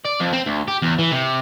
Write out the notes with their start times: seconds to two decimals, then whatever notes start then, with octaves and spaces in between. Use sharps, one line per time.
0.05 D5
0.21 F2
0.33 C4
0.47 D2
0.68 G4
0.82 E2
0.99 E3
1.11 C3